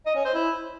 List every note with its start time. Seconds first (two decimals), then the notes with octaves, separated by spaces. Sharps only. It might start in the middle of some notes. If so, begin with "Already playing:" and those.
0.06 D#5
0.16 C#4
0.25 C5
0.34 E4